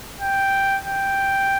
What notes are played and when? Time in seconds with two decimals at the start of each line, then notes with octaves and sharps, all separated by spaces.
0.21 G5
0.85 G5